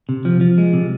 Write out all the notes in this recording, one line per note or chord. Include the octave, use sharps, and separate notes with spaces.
C3
F3
F3
G#3
C3